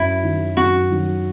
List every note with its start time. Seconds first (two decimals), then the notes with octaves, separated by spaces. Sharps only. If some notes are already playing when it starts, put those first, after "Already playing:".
Already playing: F#2 E4
0.23 D#3 F#3
0.57 F#2 F#4
0.90 D#3 F#3